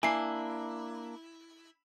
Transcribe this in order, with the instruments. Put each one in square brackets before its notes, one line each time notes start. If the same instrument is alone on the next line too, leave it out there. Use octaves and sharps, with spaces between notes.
[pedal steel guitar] A#3 D4 [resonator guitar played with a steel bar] E4 [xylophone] G#5 C7